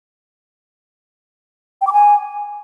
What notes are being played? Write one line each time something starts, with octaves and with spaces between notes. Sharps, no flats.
G5
D6
G#5